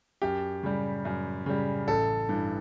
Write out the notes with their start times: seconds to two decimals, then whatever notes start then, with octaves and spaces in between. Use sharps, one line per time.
0.22 F#2 G4
0.63 C#3 G3
1.05 F#2
1.46 C#3 G3
1.87 A1 A4
2.29 G2 E3